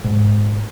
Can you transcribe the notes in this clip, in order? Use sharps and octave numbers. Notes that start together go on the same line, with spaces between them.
G#2